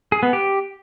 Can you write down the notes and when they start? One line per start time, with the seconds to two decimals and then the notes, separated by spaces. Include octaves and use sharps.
0.12 G#4
0.23 B3
0.33 G4